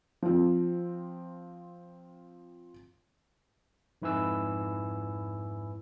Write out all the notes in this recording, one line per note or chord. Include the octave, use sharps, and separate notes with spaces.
F3 C4
F2 G#2 E4 B4 G#5 E6